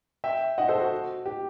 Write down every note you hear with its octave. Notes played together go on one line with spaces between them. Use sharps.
E5 G5
D#5 F#5
A4 C5
F#4
G4